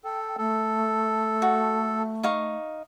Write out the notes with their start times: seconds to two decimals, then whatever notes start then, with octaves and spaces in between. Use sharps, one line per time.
0.04 A4 G5
0.38 A3 A4
1.42 F#4
2.23 D#4 F5 C#6